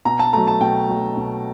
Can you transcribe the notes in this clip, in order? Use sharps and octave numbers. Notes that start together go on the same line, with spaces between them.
B2 A#5
A5
F#3 A3 A#5
A5
B2 G5
F#3 A3
B2